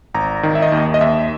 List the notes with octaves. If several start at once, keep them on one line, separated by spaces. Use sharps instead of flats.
G#1 A#5
D#3
E5
D#5
D#2
D#5
D#2 E5